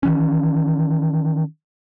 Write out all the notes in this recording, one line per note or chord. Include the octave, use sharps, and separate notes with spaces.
D#3 E3 C#4